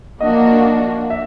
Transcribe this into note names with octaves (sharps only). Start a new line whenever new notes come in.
F3 A#3 D4 F#4 D#5
E5